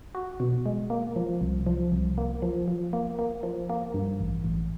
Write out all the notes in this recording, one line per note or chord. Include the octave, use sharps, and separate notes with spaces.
F#4
B2
G#3
A#3
F3
C2
F3
C2
A#3
F3
F3
A#3
A#3
F3
A#3
G2
A1
A1